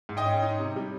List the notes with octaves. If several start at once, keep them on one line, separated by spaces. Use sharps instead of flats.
G#2
D#5 G5
C#4
D#4
C3
G3